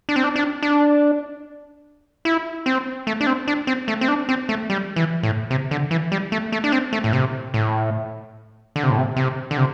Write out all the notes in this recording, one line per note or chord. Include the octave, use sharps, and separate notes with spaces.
D4
C4
D4
D4
D4
E4
C4
A3
D4
C4
D4
C4
A3
C4
D4
C4
A3
G3
E3
A2
C3
D3
E3
G3
A3
A3
D4
C4
A3
A2
C3
A2
D3
C3
A2
C3
C3
D3
C3